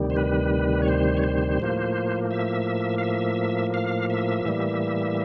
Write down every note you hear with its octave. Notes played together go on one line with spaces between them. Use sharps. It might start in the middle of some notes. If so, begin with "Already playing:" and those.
Already playing: D2 C3 D#3 G3
C5
B4
C#5
C5
C#5
C5
A2 F3 A#3
E5
F5
E5
F5
E5
A2 E3 G3 A#3